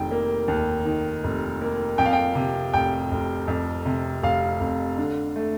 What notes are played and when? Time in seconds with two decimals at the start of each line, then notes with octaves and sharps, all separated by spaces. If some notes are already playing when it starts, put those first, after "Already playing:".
Already playing: F1 D#3 G5
0.11 A#3
0.48 D#2
0.85 D#3
1.24 F1
1.61 A#3
1.98 F2 G5
2.05 F5
2.13 G5
2.35 C3
2.73 F1 G5
3.11 F1
3.48 F2
3.86 C3
4.23 F1 F5
4.60 F1
4.98 D3
5.36 A3